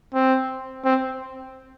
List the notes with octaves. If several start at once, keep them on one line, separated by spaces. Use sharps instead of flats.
C4
C4